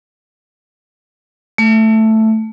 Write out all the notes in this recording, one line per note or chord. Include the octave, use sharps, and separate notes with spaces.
A3